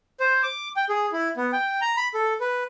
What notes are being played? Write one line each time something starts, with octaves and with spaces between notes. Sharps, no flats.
C5
D6
G5
G#4
E4
B3
G5
A#5
B5
A4
B4